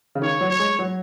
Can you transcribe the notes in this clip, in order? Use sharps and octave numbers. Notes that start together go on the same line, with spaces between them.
C#3
D#3 C#5
F#3
C#5
G#3
F#3